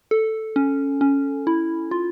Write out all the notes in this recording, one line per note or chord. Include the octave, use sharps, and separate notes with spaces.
A4
C#4
C#4
E4
F4